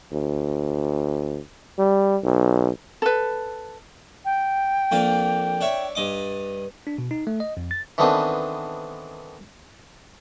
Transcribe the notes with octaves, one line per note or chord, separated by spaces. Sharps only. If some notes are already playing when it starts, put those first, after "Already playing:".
D2
G3
B1
A4 B4
G5
F2 A#3 D4
D4 C#5 E5
G2 D#5 D6
D4
B2
D#4
A3
D#5
F2
A6
D#3 E3 A3 B3 C4 D4